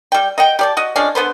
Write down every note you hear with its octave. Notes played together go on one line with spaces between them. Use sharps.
G3 G5
D#5 F#5 G5
G4 D5 A5
F#4 D#5
F3 G#3 C#4 D4
D3 B3 B4 C5